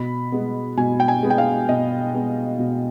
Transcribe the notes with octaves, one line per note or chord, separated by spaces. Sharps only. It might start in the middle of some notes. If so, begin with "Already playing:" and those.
Already playing: B2 B5
G#3 B3
B2 G#5
G5
G#5
G#3 B3
G5
F5
B2 D#5
G#3 B3
B2